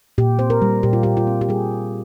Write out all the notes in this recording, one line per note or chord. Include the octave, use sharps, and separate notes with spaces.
A#2 G4
C4 C5
A#4
G3
A#2 G4
F4
A#2 G4
F4
C4
G4
G3 G#4